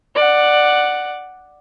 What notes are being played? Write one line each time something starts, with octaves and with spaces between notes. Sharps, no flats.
D5 F#5